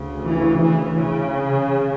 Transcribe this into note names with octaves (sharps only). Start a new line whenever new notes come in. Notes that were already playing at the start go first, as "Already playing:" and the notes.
Already playing: D2 C#3
E3
E3
C#3